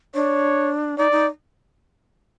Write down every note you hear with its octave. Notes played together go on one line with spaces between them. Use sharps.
D4 C#5
D#4 D5
D#4